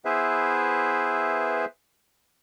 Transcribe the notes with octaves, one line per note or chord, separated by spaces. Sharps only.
B3 E4 G#4 B4 C5 E5